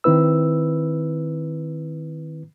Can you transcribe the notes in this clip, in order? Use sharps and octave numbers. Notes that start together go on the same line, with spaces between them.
D#3 C4 E4 B4 E6